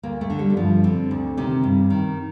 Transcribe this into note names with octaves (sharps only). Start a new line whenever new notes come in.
D2 A#3
A3
D3
G3
G3
G2 F3
D3 C4
D2
C3 D#3
G2
D#3